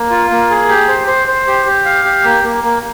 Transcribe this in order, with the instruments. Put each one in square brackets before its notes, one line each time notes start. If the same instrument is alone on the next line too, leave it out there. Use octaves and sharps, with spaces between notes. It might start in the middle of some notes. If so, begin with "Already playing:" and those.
Already playing: [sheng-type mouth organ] A#3
F4
A#3
G#4
G4
C5
C5
C5
G4
G4
F5
G4
A#3
A#3
A#3